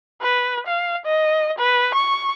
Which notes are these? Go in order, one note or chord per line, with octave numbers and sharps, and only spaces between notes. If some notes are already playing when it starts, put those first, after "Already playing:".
B4
F5
D#5
B4
C#6